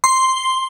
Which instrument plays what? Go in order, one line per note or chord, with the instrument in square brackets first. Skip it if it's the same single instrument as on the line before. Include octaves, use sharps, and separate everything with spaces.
[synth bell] C6